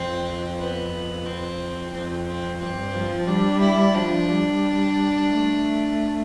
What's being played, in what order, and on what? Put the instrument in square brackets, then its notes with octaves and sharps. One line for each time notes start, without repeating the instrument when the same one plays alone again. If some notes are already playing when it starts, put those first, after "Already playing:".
Already playing: [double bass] F2 [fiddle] C4
[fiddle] B3
C4
[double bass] F2 [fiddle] C4
[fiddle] C4
[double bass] G2 [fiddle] C4
[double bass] F3
[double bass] G3 [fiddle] D4
[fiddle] E4
[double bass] F3 [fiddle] D4
[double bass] G3
A3